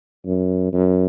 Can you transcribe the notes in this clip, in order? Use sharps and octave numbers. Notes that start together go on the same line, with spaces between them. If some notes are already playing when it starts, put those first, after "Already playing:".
F#2
F#2